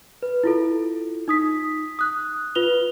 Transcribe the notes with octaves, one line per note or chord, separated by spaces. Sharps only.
B4
E4 F4 A4
D#4 D#6 B6
D#6 F#6
F4 B4 F7 G7